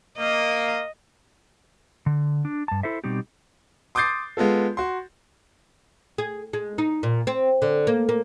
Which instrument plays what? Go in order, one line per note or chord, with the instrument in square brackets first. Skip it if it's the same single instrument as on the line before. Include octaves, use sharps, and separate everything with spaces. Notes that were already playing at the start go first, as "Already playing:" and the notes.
[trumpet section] A#3 [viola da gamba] D#5
[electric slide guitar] D3
D4
G2 A5
E4 A4 C5 E5
B2 G3 C4 D#4 G4
[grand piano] C6 D6 D#6 G6 A6 C7
G#3 B3 F4 A4
F#4 C6
[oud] G#4
G#3
D#4
A#2
C4
D3
A#3
A#3